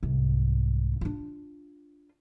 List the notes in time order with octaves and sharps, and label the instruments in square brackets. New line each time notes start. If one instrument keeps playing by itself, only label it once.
[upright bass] C2 G#2
D4 F4